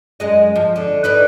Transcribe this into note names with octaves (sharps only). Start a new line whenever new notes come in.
F#2 G#3 D#5
F3
D3
D#4 B4 D5